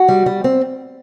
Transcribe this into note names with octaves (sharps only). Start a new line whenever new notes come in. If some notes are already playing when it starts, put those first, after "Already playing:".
Already playing: F#4
G3
G3
C4